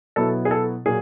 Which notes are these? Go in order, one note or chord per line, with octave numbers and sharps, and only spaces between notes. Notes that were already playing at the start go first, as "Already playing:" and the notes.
B2 F#3 B3 E4 A4
G#4
A4
A#2 F#3 G#4